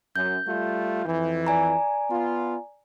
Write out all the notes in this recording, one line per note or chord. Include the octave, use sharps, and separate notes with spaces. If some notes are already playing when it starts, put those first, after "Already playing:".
F#2 G6
G3 A3 F4
F2 E3
D5 G#5 A#5
B3 F4